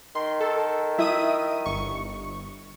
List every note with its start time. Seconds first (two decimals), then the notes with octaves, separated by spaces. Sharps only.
0.15 D#3 C6
0.40 A4
0.98 E4 E5 D#6 D#7
1.66 G1 C#6